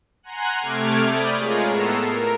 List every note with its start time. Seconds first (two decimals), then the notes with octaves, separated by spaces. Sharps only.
0.23 F#5 G#5 A#5 C6 F#6
0.59 C3 A3 D6 F6 G#6
1.04 D5 B5 D#6 G6
1.37 G#3 F4 G#4 A#4 C#5
1.67 A2 B3 A4 A#5 E6 C7
2.06 A#4